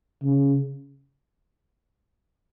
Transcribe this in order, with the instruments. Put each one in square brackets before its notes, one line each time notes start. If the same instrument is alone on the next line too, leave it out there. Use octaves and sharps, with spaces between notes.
[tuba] C#3